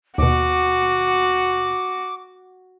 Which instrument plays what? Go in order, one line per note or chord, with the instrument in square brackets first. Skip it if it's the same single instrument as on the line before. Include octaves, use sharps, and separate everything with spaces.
[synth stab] D#2 B2 [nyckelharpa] F#4 [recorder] D6